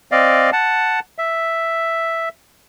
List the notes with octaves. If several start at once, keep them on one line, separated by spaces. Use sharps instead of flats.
C4 D5 D#5 F5
F#5 A5
E5